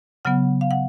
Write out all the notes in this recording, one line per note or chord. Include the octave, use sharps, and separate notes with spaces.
C#3 F#3 B3 F#5
F5
F#5